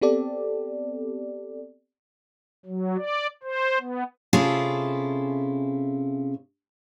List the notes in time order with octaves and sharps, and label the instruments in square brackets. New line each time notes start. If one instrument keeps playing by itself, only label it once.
[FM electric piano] B3 C4 G4 A4 D5
[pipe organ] F#3
D5
C5
B3
[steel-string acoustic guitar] C3 C#4 E4 F4 G#4 A4